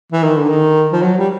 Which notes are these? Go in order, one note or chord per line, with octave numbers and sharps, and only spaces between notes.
E3
D#3
D3
D#3
F3
F#3
G3